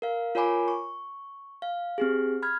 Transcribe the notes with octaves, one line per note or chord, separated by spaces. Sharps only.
A#4 F5
F4 A#4 C#5 G#5 B5 D6
C#6
F5
C4 G4 G#4
B5 F6 G#6